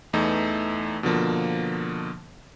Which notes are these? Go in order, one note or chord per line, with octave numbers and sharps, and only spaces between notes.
E2 E3 A3 D#4
B2 D3 F3 A#3